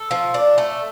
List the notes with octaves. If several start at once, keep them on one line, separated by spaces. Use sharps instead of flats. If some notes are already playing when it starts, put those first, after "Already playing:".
Already playing: A4
F3
D4
A3